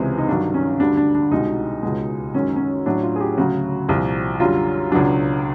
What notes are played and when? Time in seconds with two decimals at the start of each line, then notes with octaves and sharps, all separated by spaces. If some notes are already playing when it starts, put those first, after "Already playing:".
Already playing: C#2 C3 E3 G#3
0.18 D#4
0.29 G2 D#3 F#3 D4
0.54 C#4
0.80 D2 D3 G3 D4
0.97 D4
1.15 D4
1.31 C2 B2 G#3 D#4
1.83 C#2 B2 G#3
2.34 F#2 D#3 G#3 C#4
2.56 C#4
2.86 A2 F#3 D4
3.03 F4
3.16 G#4
3.20 G4
3.37 D2 C#3 F#3 F#4
3.89 C2 A#2 F3
4.40 F#2 D3 G3 F4
4.92 C#2 B2 F#3 D4